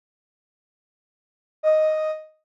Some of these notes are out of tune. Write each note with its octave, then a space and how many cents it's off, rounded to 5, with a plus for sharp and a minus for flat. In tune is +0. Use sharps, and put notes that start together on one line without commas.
D#5 +0